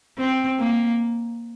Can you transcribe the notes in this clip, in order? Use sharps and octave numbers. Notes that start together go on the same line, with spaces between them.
C4
A#3